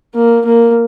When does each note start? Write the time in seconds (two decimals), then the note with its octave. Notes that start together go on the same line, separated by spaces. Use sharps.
0.15 A#3
0.46 A#3